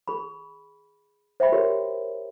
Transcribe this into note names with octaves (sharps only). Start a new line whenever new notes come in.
G#4 B5
C5 E5 G5 B5
F#4 G4 A#4 C#5